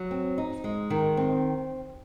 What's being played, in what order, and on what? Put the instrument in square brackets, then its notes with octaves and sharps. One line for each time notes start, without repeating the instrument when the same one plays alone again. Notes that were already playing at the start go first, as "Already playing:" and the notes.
Already playing: [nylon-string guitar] F#3
C4
D#4
G#3
D#3
C4